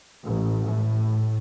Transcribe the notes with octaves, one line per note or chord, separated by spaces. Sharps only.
A1
A2